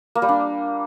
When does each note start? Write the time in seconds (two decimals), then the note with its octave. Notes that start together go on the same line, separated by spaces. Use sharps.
0.15 A#3
0.22 G3
0.29 D4